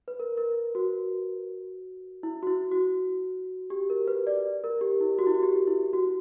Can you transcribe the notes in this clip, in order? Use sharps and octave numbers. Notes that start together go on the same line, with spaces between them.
B4
A#4
A#4
F#4
E4
F#4
E4
F#4
G4
A#4
B4
D5
A#4
G4
E4
F#4
E4
F#4
G4
E4
F#4